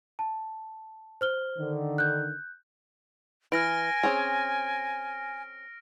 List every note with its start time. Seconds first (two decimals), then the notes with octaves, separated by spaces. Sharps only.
0.19 A5
1.21 C5 F6 G7
1.59 D3 D#3
1.98 F#6 G6
3.52 E3 G#5 F6 A#6 D7
4.03 C4 C#4 G#4